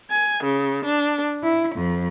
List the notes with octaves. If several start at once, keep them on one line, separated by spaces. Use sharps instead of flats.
G#5
C#3
D4
E4
F2